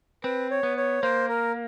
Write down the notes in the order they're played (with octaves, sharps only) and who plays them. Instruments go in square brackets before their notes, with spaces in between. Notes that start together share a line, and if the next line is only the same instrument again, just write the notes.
[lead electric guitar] C4 [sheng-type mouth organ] B4
[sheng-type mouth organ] C#5
[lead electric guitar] B3
[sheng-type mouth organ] C#5
[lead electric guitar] A#3 [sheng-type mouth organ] C5
[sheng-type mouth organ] A#4